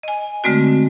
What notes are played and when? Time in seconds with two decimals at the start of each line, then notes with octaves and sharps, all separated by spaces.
0.03 D#5 G#5
0.44 D3 G#3 A3 C4 F#4